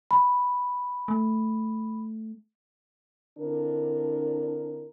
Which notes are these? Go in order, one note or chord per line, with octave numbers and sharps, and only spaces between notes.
B5
A3
D3 C4 D4 E4 A#4